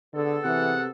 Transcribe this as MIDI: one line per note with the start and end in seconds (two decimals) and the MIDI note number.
0.14 0.38 50
0.14 0.91 59
0.14 0.91 68
0.14 0.91 69
0.44 0.89 48
0.44 0.74 52
0.44 0.84 78